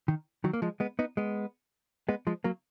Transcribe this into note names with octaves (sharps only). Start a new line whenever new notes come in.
D#3
D#3 F#3
A#3
F3 G#3
G#3 B3
B3 D#4
G#3 B3
G#3 B3
F3 G#3
F#3 A#3